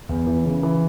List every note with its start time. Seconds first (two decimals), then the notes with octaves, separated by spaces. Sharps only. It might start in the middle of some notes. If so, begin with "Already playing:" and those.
0.09 E2
0.27 E3
0.45 C#3
0.63 E3